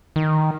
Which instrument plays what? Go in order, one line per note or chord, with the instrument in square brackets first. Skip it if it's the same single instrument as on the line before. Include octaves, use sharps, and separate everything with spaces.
[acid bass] D#3